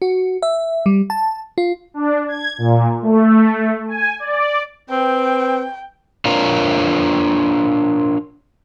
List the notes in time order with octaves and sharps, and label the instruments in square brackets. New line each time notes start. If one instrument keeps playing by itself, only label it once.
[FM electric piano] F#4
E5
G3
A5
F4
[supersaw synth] D4
G#6
A#2
A3
G#5
D5
[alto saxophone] C4 [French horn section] B4 [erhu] G5
[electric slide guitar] D4 F4 A#4 C#5 F5 A#5